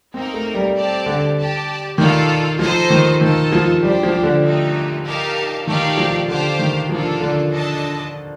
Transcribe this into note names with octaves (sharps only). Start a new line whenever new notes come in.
A#3 C4 D#4 A#4
A3
G3
C4 G4 D5 A5
D3
G4 D5 A5
D#3 F4 A4 D5
F3 D#4 A4 C5 D#5
D#3
D#3 F4 A4 D#5 A5
F3
G3 D4 G4 C5
F3
D3
A3 D#4 G4
D#4 G4 A#4 F5 A5
D#3 A3 D#4 G4 D5 F5
F3
D3 G4 C5 F5 A5
D#3
F3 A#3 D4 F4 A4
D3
D4 A4 D#5 A5